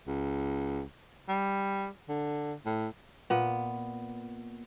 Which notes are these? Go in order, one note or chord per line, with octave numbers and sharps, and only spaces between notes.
C#2
G3
D3
A2
A#2 B3